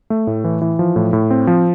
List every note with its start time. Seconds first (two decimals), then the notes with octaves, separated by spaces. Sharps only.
0.10 A3
0.27 A2
0.44 E3
0.61 E3
0.79 F3
0.96 A2
1.13 A2
1.31 C4
1.47 F3